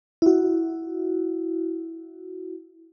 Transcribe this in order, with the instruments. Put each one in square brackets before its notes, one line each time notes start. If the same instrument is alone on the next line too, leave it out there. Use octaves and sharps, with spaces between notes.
[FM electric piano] E4 F#4